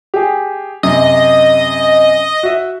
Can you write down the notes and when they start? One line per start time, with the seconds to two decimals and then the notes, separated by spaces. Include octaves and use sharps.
0.14 G4 G#4
0.83 F#2 C3 D#5
2.43 F#4 E5